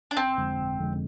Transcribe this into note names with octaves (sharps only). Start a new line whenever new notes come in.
D4
G1 C4
F2 D3 G#3
G1
F2 D3 G#3